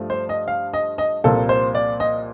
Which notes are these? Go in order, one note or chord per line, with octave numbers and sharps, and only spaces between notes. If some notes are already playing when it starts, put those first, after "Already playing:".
Already playing: G2 F3 A3
C5
D#5
F5
D#5
D#5
C2 A#2 F3 A#3 A4
C5
D5
D#5